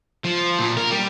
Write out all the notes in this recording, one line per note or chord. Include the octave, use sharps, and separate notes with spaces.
F3
A#2
A#4
G3